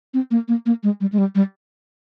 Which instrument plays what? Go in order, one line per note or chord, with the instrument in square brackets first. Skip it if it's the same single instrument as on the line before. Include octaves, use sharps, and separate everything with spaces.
[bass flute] C4
A#3
A#3
A#3
G#3
G3
G#3
G3
G3